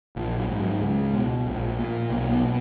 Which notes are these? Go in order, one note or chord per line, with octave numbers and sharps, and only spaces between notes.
A#1 F3
F#3
G#2
F#3
C#2 G#3
B2
A#1
A#2
B1 A#3
B3
B2